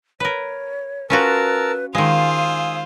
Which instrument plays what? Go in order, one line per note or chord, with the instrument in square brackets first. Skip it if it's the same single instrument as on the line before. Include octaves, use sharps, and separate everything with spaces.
[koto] A#4 B4 [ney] C#5
[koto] C#4 F4 F#4 [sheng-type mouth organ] A#4 A5 E6 [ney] B4
[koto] D#3 G#3 [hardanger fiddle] F4 C5 [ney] F5 [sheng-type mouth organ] G#5 D#6 E6